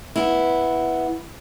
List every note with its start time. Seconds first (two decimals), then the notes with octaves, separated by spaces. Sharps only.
0.16 B3 E4